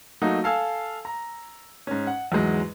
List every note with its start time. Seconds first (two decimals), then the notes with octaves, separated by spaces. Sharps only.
0.22 F#3 A3 A#3 D#4 F#4
0.44 A4 F5 G#5 E6
1.05 A#5
1.87 G#2 C#4
2.07 F#5
2.32 E2 G#2 F#3 G#3